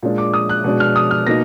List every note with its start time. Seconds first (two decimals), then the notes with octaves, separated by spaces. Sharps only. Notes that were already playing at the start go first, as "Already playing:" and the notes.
0.03 A#2 G#3 D4
0.18 D6
0.34 D#6
0.49 F#6
0.64 B2 G#3 D4
0.80 F6
0.96 D#6
1.11 F6
1.26 B2 A#3 D#4 A#6